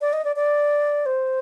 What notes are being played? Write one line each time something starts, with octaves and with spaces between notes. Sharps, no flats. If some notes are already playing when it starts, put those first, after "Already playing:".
D5
D#5
D5
D5
C5